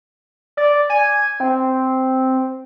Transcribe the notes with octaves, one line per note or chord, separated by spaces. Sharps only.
D5
G#5
C4